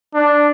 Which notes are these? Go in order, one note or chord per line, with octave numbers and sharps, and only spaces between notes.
D4